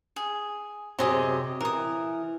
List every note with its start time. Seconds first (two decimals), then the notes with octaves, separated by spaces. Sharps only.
0.16 G#4
0.99 F#2 C3 G4 G#4 D#5
1.61 E3 A#4 D#6